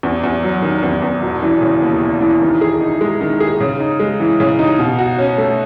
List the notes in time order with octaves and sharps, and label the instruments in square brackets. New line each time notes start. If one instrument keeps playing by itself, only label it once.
[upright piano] E2
E2
F#3
D#3
E2
E2
E1
E3
C#3
D#2
E1
E3
D#3
G#4
D#4
G#3
D#3
G#4
C#3
D#4
G#3
E3
C#3
D#4
B2
F#4
C#4
A3